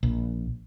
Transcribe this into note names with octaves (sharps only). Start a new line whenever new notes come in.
A#1